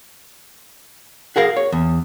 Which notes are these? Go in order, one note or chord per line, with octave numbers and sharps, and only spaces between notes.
F#4 G#4 A#4 F5
C#5
E2